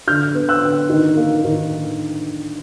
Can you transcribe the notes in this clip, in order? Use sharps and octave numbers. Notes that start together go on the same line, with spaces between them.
D3 F6 G6
B3
E6 F#6
D3
D#3
A#3
D#3